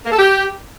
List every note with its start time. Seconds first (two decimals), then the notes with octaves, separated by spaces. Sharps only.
0.05 A#3
0.12 A4
0.19 G4